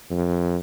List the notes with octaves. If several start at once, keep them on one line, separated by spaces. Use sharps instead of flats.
F2